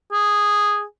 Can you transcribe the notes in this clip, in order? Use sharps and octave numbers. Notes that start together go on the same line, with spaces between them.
G#4